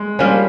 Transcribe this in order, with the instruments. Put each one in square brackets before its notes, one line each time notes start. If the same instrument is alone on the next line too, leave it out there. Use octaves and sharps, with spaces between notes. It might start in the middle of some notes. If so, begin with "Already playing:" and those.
Already playing: [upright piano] G#3
[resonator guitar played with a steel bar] F3 A#3 C#4 [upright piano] G3